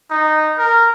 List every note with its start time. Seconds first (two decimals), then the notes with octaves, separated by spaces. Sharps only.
0.10 D#4
0.58 A#4